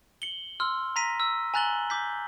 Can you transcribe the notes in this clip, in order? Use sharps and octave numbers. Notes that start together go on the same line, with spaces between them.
C#7 F#7 G7
C6 E6 F6
A#5 A#6 B6 D#7
E6
G#5 A#5 F#6 A6 F#7 G7
D6 G6 B6